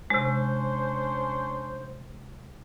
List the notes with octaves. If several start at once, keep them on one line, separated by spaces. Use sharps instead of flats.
C3 G#3 C#4 D4 C5